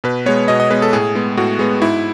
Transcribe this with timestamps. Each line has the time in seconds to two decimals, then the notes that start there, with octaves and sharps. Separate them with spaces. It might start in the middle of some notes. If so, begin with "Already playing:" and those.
0.04 B2 B4
0.26 G#3 B3 C#5
0.48 B2 D#5
0.60 D#5
0.71 G#3 B3 B4
0.82 A4
0.93 A2 G#4
1.15 G#3 B3
1.37 A2 F#4
1.59 G#3 B3
1.81 G#2 E4